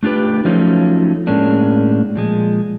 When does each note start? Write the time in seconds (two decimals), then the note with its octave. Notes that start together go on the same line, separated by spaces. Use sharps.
0.03 A3 D4 F4 G4 B4
0.45 F3 F#3 A3 C#4 D#4 F4
1.27 A2 G#3 A#3 C#4 D4
2.16 A#2 F3 G#3